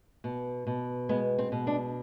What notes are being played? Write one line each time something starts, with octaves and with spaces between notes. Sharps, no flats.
B2
B2
G#3 B3
C4
B2
D4